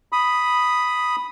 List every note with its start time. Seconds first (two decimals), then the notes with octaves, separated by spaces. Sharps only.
0.12 B5 D#6